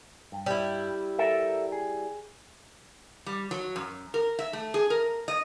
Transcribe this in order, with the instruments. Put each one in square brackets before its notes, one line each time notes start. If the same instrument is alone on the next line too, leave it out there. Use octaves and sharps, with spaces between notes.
[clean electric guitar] G2
[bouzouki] G3 E4
[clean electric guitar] A4 A#4 E5
G#4
[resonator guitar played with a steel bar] G3
F#3
F#2
A#4
E5
A3
G#4
A#4
D#5